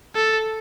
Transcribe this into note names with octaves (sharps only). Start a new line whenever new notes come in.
A4